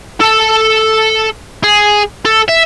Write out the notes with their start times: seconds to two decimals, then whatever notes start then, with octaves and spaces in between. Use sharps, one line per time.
0.21 A4 A5
1.64 G#4
2.25 A4
2.48 E5